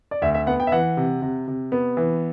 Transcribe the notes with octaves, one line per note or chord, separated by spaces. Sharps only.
D5
D2 E5
E5
B3 F#5
G5
E5
E3 F#5
C3
C3
C3
B3
E3